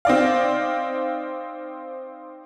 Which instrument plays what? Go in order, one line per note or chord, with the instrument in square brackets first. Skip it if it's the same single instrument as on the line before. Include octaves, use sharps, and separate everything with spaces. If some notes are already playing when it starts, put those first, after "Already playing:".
[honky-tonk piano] C4 D#4 D5 F5